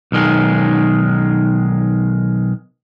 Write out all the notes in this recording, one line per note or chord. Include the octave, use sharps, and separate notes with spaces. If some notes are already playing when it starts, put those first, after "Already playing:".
B1 D#3 G#3